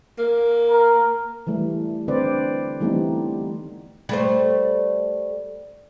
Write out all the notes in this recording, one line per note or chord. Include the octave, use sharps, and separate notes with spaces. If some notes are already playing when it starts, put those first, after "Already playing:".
A#3
A#4
E3 G3 A3
D3 C4 B4 C5 D5
E3 G3 A3 B3 C4 D#4
G3 A3 C5